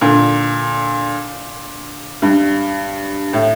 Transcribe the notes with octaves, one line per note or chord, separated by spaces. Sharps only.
A#2 D3
G2
A2